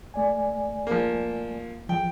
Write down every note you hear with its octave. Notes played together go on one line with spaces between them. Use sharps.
A3 D5 G#5
F3 A#3
F3 G5